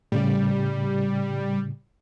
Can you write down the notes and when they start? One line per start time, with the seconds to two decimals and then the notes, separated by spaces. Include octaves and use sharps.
0.12 A2 C#3 G3